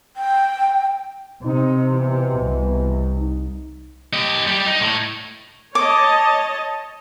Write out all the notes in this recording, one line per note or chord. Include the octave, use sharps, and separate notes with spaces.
G5
C3 C4 D#4
B2 E3
C2
D#4
G4 D#5
G3 G4
D#4
A2 A3
C#5 D#5 A5 D6